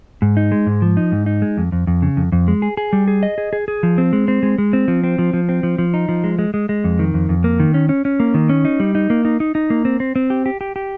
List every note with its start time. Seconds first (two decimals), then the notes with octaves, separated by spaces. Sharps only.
0.22 G#2
0.37 D#4
0.52 G#3
0.66 G#2
0.82 F3
0.97 D#4
1.12 G#2
1.26 D#4
1.42 G#3
1.57 F2
1.72 F2
1.87 F2
2.02 C#3
2.17 F2
2.32 F2
2.48 G#3
2.62 G#4
2.77 G#4
2.93 G3
3.08 G#4
3.23 D#5
3.38 G#4
3.53 G#4
3.68 G#4
3.83 F3
3.98 C4
4.13 G#3
4.28 C4
4.43 G#3
4.58 G#3
4.73 C4
4.88 F3
5.04 C4
5.19 F3
5.33 F3
5.49 C4
5.63 F3
5.78 F3
5.94 D#4
6.09 F3
6.24 G#3
6.39 G#3
6.54 G#3
6.69 G#3
6.84 F2
6.99 D#3
7.14 F2
7.29 F2
7.44 A#3
7.60 D#3
7.74 C#4
7.89 C#4
8.05 C#4
8.20 A#3
8.34 D#3
8.49 C#4
8.65 D#4
8.80 G3
8.95 D#4
9.10 A#3
9.25 D#4
9.40 D#4
9.55 D#4
9.70 A#3
9.85 C4
10.00 C4
10.16 C4
10.30 G4
10.46 G4
10.61 G4
10.76 G4